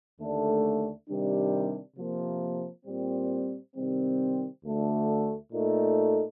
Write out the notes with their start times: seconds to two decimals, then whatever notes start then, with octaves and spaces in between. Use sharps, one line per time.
0.19 D#2 D3 A3 D4
1.09 C3 D#3 G3 D4
1.97 C3 F3 A#3
2.86 A#2 G3 C4
3.75 C3 D#3 G3 C4
4.64 D2 D3 A3
5.52 A#2 A3 D#4 A4